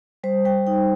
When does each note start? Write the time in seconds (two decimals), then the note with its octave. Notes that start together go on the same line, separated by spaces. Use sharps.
0.24 G3 C5
0.45 G3 G5
0.67 D#4 G5